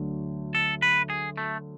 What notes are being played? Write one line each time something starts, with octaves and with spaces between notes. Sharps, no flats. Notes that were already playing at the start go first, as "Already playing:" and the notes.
Already playing: D2 D3 F#3
A4
B4
G#4
A3